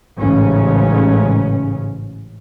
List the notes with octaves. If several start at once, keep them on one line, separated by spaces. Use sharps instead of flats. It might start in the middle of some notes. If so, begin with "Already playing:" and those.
A1 G#2 C#3 C#4